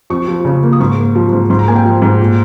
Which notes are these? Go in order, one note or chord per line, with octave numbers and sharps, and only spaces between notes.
F2 C#6
F3
C#3
A#3
D#6
G#2 C#6
A#3
F3
G#2
G#2 C6
A#5
A#3 G#5
G5
F3
G#2
A#2